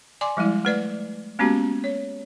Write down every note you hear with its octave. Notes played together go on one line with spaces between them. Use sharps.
D5 G#5 C6 D6
F3 G3 G#3 E4
A3 B4 D5
G#3 A#3 B3 C#4 F#4 G4
C#5